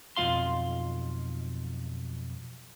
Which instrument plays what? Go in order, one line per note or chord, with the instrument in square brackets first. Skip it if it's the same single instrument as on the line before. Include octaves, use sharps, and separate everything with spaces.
[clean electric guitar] B1 F2 F#3 F4 F5 C6